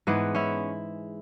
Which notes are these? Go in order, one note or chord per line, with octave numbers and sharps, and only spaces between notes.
G#2 E3 G#3 B3
C#4 E4